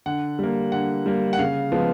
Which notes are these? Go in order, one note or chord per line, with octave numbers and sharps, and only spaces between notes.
D3 F#5
G3 A#3
D3 F#5
G3 A#3
F#5
C#3 F5
F3 G#3 B3